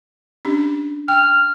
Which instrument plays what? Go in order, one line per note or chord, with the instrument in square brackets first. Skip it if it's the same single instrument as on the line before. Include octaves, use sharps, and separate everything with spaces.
[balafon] C#4 D4 G4
[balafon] G5 [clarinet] F6